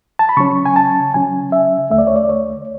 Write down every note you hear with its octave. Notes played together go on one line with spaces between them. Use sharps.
A5
B5
C#3 F#3 C#4 C#6
G#5
A5
C#3 F#3 C#4 G#5
E5
D2 D3 A3 E5
D5
C#5
D5
C#5